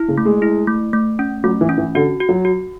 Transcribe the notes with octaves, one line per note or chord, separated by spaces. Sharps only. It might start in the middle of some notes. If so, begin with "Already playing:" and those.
Already playing: E4
C#3
A3
G#3
E4
A3
A3
C#4
F#3 A3
E3
C#4
E3
D3 F#4
F#4
F#3
F#4